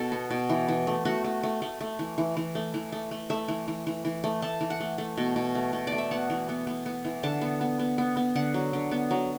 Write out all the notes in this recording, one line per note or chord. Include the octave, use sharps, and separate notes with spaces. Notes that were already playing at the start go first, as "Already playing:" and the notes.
Already playing: B2 A4
B3
B2
E3
E3
A3
A3 F#4
A3
A3
A3
A3
E3
E3
E3
A3
E3
A3
A3
A3 E5
E3
E3
E3
E3
A3
A3 A5
E3
F#5
A3
A3
B2
B2
A3
B2
A3 D5
E5
B3 F#5
E3
B3
B3
B3
E3
D3 A5
B3
B3
B3
B3
B3
D3 F#5
F#3
D3
B3
F#3